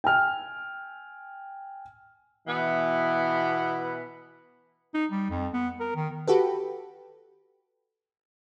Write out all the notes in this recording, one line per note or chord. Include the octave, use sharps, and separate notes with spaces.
G5 G#5 F6
B2 E3 B3
D#4
G3
F2
B3
A#4
D#3
F#4 G4 A4 B4